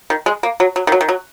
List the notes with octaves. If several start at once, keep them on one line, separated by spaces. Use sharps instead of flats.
D#3
G#3
A#3
F#3
F#3
D#3
F#3
D#3
F#3